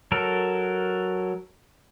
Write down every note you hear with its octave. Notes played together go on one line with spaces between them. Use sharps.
F#3 A4 A#4